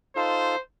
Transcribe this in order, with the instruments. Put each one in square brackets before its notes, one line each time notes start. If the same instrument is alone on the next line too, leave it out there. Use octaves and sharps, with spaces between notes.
[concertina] D#4 F4 A4 [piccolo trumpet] C5